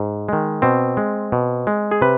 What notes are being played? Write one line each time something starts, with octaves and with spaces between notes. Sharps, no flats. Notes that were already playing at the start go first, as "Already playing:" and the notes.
Already playing: G#2
D#3 G#3
B2 C4
G#3
B2
G#3
G#4
C3 B4